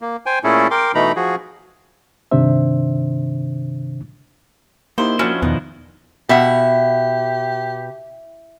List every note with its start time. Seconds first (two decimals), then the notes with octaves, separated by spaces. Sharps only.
0.02 A#3
0.26 C5 G5 G#5
0.44 A#2 A3 C#4 E4 G#4 A4
0.71 A#4 G5 C6 D6
0.95 B2 E3 A3 D#4 A#5 B5
1.16 F3 F#4 G#4
2.31 G2 C3 D#3 D4 C5 E5
4.98 A#3 D#4 E4 G4 C5
5.19 F3 C#4 D4 E4 F#4 C5
5.42 E2 B2 D#3 B3 D#4
6.29 B2 E4 G4 E5 F#5